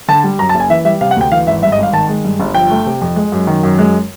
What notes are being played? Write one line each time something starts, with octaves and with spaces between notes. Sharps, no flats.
D3 A5
G3
F#2 A#5
A5
F#1
G#5
E3 E5
G3 E5
C3 F5
F#5
D2 G5
E3 F5
G#1 E5
G2 E5
D#5
G#1 F5
D#3 A5
G#3
G2
G1
F3 G5
A3
C3
F2
G#3
F#2
D#3
F#2
G#3